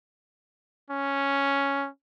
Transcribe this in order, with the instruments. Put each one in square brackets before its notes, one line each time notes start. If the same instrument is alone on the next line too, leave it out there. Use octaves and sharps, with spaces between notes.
[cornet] C#4